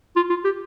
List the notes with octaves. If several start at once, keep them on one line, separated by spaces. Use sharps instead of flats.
F4
F4
G4